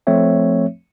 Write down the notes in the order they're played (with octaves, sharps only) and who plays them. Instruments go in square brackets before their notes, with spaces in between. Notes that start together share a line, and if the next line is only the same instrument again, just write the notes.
[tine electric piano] F3 A3 C4 C#5 E5